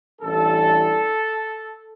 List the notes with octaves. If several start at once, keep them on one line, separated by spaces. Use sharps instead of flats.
A1 G2 E3 A4